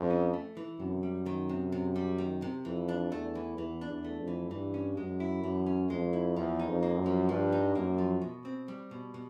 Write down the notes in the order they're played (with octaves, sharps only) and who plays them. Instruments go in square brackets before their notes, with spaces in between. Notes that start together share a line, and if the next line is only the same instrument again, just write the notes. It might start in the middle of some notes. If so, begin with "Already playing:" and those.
Already playing: [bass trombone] F2
[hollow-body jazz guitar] C#4
A3
E3
[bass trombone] F#2 [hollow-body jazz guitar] C3
[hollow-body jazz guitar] G3
D#3
C3
C3
G3
D#3
C3
[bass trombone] F2 [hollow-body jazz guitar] E3
[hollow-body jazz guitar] D4
[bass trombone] E2 [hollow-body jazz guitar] A3
[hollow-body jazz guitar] E3
[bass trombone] E2 [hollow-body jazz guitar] E3
[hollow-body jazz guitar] D4
[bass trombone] E2
[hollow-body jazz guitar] A3
[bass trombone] F2
[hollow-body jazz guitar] E3
[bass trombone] G2 [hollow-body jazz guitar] E3
[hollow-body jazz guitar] C#4
[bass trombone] F#2 [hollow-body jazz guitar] G#3
[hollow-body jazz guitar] E4
[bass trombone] F#2 [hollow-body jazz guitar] E3
[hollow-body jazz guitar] C#4
[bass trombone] F2 [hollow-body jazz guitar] G#3
[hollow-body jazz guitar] E4
[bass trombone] E2 [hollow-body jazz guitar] F3
[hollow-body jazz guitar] D#4
[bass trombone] F2
[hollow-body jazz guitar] A#3
[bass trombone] F#2
[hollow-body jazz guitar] F3
[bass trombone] G2 [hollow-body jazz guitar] F3
[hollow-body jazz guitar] D#4
[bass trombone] F#2 [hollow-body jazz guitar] A#3
[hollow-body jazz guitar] F3
B2
C4
G3
B2
B2